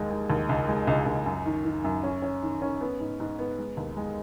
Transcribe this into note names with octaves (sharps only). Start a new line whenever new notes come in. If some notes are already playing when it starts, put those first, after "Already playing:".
Already playing: D#2 G#3
G#3
D#2
C#2
G#3
C#2
C#2
F#2
D#3
D#3
F#2
C#4
C#4
D#3
C#4
B3
G#2
G#2
B3
G#3
D#2
G#3